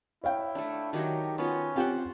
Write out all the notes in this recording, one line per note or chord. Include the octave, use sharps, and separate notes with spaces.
E4 C#5 F5 G5
A3 D4
D#3 F#3 A3 G4
B3 C#4 F4
C4 F4 G4 C5 F#5 G5